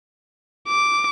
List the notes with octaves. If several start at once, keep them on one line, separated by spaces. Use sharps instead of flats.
D6